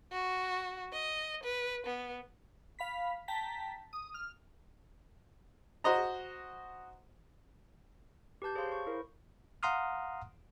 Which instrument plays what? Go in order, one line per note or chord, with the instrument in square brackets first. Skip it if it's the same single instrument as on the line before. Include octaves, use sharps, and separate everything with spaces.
[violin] F#4
D#5
B4
B3
[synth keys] F5 B5 B6
G5 A5 A#5 B6
D#6
F6
[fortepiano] F#4 C5 D#5 A#5
[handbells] G4 B4 A5 G6
G#4 C5 C#5 F5 C6
C#6
E4 A#4 C5
[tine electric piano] F5 F#5 A#5 C6 D#6 F6